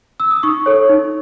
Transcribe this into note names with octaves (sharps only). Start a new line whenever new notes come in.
E6
D#6
D#4 C#6
A4 C#5
D#4